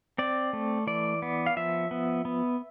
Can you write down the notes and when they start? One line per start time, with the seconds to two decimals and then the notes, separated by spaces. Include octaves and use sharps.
0.18 C4 D5
0.53 A3
0.87 E3 D5
1.22 B3
1.46 F5
1.57 F3 E5
1.91 B3
2.25 B3